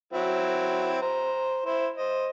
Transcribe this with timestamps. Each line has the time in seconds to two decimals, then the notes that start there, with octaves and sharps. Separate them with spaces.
0.13 F#3 C4 E4
1.02 C5 A#5
1.66 E4 C5
1.97 C5 D#5